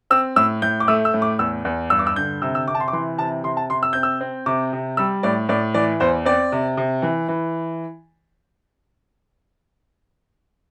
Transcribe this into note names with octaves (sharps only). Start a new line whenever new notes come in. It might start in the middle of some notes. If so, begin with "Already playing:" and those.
C4 E6
A2 E6
A2 G6
D6
A3 E6
E6
A2
D6
E2 E6
E2
G2 E6
D6
E6
D3 G6
C3 E6
E6
C3 D6
A5
C6
D6
E3 C6
C3 A5
C3 C6
A5
C3 C6
E6
C4 G6
E6
C4
C3 D6
C3
G3 E6
A2 D5
A2 D5
E3 D5
E2 C5
C4 D5
C3
C3
E3
E3